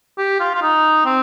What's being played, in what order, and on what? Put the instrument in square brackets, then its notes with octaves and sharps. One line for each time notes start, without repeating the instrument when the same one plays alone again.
[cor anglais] G4
F4
F4
D#4
C4